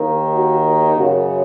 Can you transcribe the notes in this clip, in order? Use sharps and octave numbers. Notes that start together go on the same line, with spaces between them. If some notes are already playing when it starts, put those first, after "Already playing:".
Already playing: D#2 D#3
F#4
F#2 C#3 F#4